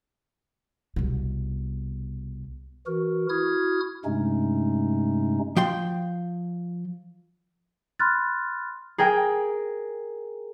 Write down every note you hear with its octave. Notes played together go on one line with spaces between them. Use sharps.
C2 B2
E3 F#4 A#4
E4 F#4 D#6 F6 G#6
G2 C3 G#3 A3 C#4 D#4
F3 G5 C6
B5 C6 F6 F#6 A6
G#4 A#4 G5